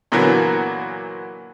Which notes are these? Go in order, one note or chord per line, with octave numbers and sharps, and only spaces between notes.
A#2 D3 E3 F#3 A#3 B3